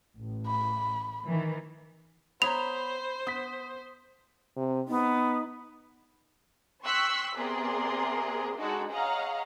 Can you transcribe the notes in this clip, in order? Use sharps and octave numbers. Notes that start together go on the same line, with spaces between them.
A1
B5
D#3 E3
B3 C5 C#5 A#5 B5 F7
B3 D#6 B6
C3
B3 D#4
G5 C6 C#6 E6 F#6 B6
C3 B3 G#4 A#4 D5 C6
G#3 D4 D#4 F#4 A4
G#4 C#5 D#5 F5 F#5 A#5